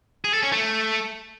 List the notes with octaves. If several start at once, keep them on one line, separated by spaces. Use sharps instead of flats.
G#4
A4
C#4
A3